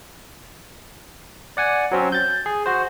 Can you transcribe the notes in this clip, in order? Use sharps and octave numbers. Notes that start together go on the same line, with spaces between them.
D5 F#5 G#5
F#3 C4 C#4
G6 A6
G#4
F#4 C5